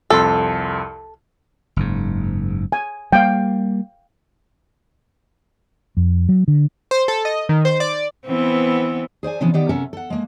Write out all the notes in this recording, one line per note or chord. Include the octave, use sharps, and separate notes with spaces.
C2 F2 A4 C6
F#1 G#2
G#5
G3 A#3 F5 G5
F2
F#3
D3
C5
A4
D#5
D#3
C5
D5
E3 B3 C4
G#4 C5 D5 G#5
C3 E3 F3 B3 C#4 D4
D#3 B3 G4 D5 F#5
C3 C#4 A4 A#4 E5 F#5
A4 F#5
G#3 A#3